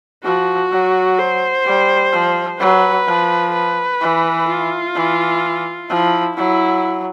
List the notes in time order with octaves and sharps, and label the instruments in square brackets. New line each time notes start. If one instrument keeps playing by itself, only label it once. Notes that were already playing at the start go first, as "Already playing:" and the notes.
[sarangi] F3 [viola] F#4
[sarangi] F#3
[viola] C5
[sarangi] G3
F3
[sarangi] F#3 [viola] B4
[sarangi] F3
[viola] B4
[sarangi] E3
[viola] F4
[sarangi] E3
[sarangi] F3 [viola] E4
[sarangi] F#3 [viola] E4